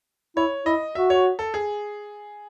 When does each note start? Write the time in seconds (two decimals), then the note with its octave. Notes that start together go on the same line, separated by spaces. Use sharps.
0.37 E4 C#5
0.66 E4 D#5
0.95 F#4 E5
1.10 C#5
1.39 A4
1.54 G#4